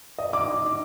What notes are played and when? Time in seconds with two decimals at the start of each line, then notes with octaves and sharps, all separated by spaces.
0.19 D#5
0.33 D6